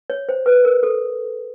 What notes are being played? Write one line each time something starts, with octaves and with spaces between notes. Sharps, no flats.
C#5
C5
B4
A#4
A4